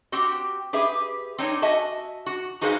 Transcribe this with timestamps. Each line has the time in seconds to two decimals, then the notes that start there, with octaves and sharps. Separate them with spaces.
0.12 C4 F#4 G4
0.73 G4 G#4 B4 E5
1.38 C4 D4 D#4 C#5
1.62 F#4 D#5 E5 G#5 A5
2.26 F#4
2.61 D#4 F#4 G#4 B4 C5 F5